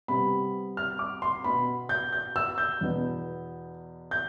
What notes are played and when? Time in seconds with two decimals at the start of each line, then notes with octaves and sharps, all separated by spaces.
0.08 C3 G3 B3 B5
0.77 F6
0.99 D6
1.22 C6
1.44 B2 B3 B5
1.89 G6
2.13 G6
2.36 E6
2.58 G6
2.81 E2 B2 B3
4.11 G6